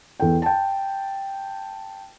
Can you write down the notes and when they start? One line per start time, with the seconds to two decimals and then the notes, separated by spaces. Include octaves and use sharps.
0.20 E2 A4 G5
0.42 G5 A5